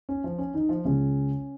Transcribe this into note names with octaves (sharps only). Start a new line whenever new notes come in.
C#4
F3 F4
C#4
D#3 D#4
F3 F4
C#2 C#3 G#3 C#4